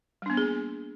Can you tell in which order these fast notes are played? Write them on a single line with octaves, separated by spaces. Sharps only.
G3 D4 B3 A#3 G#4